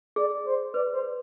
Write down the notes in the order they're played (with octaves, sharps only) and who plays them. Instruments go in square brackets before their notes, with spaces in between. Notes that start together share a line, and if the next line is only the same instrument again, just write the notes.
[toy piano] G#4 [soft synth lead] D5
[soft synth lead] C5
[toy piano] B4 [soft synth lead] D5
[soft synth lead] C5